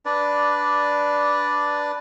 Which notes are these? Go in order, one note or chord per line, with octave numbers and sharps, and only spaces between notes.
D4 B4 D5